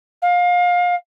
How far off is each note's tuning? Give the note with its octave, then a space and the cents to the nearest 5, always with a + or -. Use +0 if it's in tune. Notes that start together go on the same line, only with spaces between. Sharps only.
F5 +25